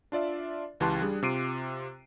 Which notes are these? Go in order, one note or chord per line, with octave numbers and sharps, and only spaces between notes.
D4 F4 D5 E5
C#2 E3 G4 A5 C6 F#6
G3 D4 G#4
C3 F4 D6 C7 D7 D#7